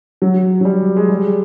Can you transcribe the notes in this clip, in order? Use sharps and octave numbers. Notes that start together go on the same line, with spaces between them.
F#3
F#3
G3
G#3
G3